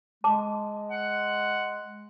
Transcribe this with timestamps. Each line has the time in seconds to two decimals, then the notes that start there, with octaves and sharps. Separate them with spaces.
0.24 G#3 A5 D6
0.91 F#5